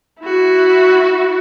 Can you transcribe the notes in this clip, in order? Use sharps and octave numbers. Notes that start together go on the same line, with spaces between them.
E4 F#4